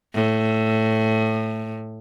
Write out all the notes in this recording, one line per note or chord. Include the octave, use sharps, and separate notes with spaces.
A2